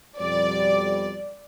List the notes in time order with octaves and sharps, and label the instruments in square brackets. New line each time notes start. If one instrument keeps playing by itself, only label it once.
[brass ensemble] F2 B2 G3 [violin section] D5